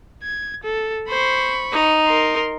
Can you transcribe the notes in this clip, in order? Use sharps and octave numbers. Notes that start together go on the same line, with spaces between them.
G#6
A4
C5 B5 C#6
D#4
A#4 C6